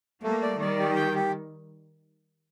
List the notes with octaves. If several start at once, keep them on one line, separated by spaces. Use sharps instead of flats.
G3 A3 A#3
D5
D#3 G3 D5
G4
G5
G4